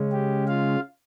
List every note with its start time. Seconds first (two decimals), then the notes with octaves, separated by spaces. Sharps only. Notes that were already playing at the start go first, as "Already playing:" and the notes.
Already playing: C#3 G#3 C#4
0.12 G4
0.48 F4 F5